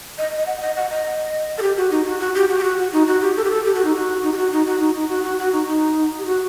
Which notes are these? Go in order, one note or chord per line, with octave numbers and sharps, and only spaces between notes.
D#5
D#5
F#5
D#5
F#5
D#5
A4
G4
F#4
D#4
F#4
F#4
G4
F#4
G4
F#4
F#4
D#4
F#4
G4
A4
G4
A4
G4
F#4
D#4
F#4
D#4
G4
F#4
D#4
F#4
D#4
D#4
F#4
F#4
F#4
D#4
D#4
G4
F#4